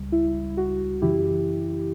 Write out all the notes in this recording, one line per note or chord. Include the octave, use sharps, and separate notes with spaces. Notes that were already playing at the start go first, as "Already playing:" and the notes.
Already playing: C#2 C#3 G3
E4
F#4
F#2 C#3 E3 E4 G4